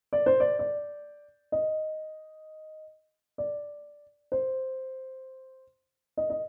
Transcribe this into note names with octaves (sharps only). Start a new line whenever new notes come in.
D5
C5
D5
D5
D#5
D5
C5
D#5
D#5